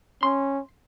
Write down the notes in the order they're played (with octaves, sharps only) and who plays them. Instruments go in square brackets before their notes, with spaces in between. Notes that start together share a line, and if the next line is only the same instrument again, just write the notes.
[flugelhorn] C#4 [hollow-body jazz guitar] C6